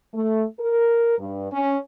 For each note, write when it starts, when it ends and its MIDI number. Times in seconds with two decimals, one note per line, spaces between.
0.14 0.44 57
0.59 1.16 70
1.19 1.48 43
1.52 1.77 61